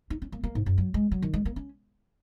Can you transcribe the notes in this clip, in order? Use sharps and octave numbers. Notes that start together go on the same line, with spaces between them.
D#4
C#4
A#3
A#3
G#2
F#2
F#3
G#3
F#3
D#3
G#3
A#3
C#4